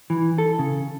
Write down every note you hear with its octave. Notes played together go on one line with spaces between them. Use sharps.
E3
A4
C#3